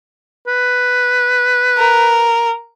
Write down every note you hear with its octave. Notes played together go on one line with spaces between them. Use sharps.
B4
A#4